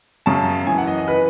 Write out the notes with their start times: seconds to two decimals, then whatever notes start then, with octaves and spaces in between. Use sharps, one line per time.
0.26 F#2 C#3 F#3 A5
0.67 F#2 E3 G#5
0.78 F#5
0.87 D#5
0.98 D#5
1.08 E3 B4